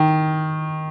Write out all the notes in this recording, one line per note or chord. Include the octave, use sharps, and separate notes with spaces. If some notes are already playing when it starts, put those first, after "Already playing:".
Already playing: D#3